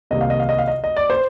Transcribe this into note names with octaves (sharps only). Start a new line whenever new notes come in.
C2 C3 D#3 A#3 D#5
F5
D#5
F5
D#5
F5
D#5
D#5
D5
C5